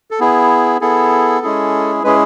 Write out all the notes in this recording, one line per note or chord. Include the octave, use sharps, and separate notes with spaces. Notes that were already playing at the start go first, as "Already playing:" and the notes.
A4
B3 E4 G#4
B3 E4 G#4 A4
G#3 C#4 E4 G#4
G#3 C#4 E4 G#4 B4